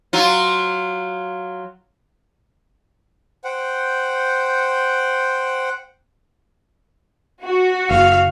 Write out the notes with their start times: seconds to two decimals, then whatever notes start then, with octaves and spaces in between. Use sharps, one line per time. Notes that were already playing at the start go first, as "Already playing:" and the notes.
0.13 F#3 F4
3.44 C5 F#5 G5
7.43 F#4
7.90 F#1 F5